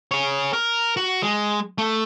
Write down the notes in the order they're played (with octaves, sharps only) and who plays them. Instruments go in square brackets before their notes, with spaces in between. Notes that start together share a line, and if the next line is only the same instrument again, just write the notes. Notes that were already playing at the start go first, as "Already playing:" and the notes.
[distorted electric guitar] G#4 C#5
A#4
F#4
G#3
A3